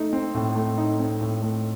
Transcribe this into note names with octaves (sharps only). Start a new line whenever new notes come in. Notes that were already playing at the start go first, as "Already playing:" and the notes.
Already playing: A3 D#4
C4
A2
A3
D#4
C4
A2
A3